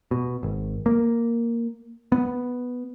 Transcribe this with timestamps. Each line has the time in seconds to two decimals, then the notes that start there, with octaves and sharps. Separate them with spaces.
0.11 B2
0.43 G#1
0.86 A#3
2.12 B3